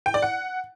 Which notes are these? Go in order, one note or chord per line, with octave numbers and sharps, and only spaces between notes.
G5
D5
F#5